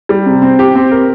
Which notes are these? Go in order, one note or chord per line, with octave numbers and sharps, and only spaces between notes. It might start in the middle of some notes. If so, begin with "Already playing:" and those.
G3
C3
C4
G4
C4
A#4